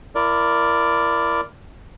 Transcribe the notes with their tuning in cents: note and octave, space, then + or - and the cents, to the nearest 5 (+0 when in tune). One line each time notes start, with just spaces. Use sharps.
E4 +30 A#4 +0 D5 -5